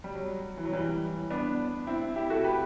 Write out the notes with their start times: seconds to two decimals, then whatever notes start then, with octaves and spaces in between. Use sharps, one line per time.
0.04 G3
0.15 F#3
0.57 E3
0.65 F#3
0.72 E3 G3
1.30 B3 D4
1.87 C4 E4
2.16 E4 G4
2.30 F#4 A4
2.44 G4 B4